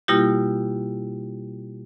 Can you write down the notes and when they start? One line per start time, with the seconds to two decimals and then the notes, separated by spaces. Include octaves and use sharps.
0.08 B2 G3 A#3 E4 F4 G4